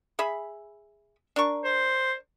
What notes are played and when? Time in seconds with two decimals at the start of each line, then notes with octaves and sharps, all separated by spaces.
0.19 G#4 E5 B5
1.36 D4 A#4 C#6
1.64 C5